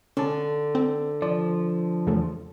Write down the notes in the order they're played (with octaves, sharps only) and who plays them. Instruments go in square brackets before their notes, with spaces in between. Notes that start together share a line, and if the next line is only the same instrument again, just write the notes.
[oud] D3 [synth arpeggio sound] C#4 A4
[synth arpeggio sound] C4
[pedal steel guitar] F3 [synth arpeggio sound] D5
[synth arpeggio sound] E2 C#3 A3